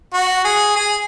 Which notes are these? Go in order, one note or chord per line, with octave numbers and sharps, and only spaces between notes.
F#4
G#4
G#4